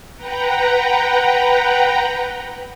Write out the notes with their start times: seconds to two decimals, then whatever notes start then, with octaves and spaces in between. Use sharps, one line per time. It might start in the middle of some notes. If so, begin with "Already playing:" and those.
0.16 B4 F#5 G5 A#5